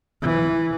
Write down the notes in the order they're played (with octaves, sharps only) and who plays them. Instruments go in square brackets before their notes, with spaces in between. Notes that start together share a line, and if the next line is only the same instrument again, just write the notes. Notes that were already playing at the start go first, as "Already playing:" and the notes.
[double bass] E3